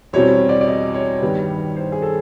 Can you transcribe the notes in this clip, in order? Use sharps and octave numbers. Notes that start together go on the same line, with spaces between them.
E2 B2 G3 C4 C#5
D5
D5
D#5
C#5
G2 D#3 G3 B3
C5
G#4
A4